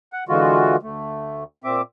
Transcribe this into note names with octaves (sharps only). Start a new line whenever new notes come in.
F#5
D3 E3 G#3 F4 F#4
D2 A3
A#2 C4 E5 D6